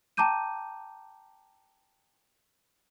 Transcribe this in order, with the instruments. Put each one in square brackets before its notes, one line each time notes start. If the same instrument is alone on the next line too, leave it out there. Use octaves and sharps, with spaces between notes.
[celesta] G5 A5 A#5 D6 G6 D#7